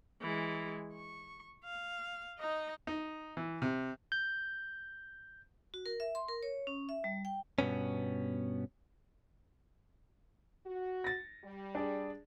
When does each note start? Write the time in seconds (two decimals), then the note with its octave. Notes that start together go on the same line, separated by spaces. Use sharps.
0.21 E3 G#3
0.93 C#6
1.64 F5
2.38 D#4 D#5
2.87 D#4
3.37 E3
3.62 C3
4.12 G6
5.74 F#4
5.86 A#4
6.00 E5
6.15 C6
6.28 A#4
6.43 C#5
6.67 C#4
6.89 E5
7.04 G3
7.25 G5
7.59 G2 B2 B3 C#4
10.66 F#4
11.04 A6 A#6
11.44 G3
11.75 D4 G#4 D5